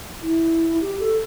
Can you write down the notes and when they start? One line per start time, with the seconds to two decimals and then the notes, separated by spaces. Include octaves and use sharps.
0.22 E4
0.81 G4
0.99 A4